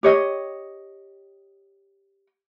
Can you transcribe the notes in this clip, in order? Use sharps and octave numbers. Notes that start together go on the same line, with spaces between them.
G4 C#5 D#5